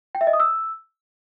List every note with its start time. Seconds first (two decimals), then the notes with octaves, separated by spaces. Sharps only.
0.15 G5
0.21 E5
0.27 D#5
0.33 D#6
0.40 E6